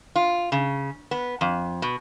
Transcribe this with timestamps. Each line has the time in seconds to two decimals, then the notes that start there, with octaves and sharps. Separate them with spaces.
0.16 F4
0.52 C#3
1.11 B3
1.41 F2
1.82 B2